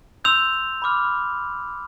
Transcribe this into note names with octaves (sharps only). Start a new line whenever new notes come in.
C6 E6 G6 F7
B5 D6 F6